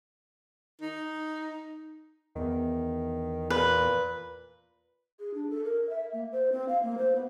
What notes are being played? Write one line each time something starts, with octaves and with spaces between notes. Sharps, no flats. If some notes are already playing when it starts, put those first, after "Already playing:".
D#4
E2 D#3
A#2 B4
G#4
D4
A4
A#4
E5
A#3
C5
C4
F5
A#3
C5
B3